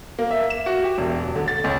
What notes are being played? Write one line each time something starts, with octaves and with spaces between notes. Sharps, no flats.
A#3
E5
E7
F#4
G4
E1
D1
D3
A6
C#2